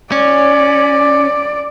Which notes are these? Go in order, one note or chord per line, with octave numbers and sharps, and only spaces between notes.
C#4 D5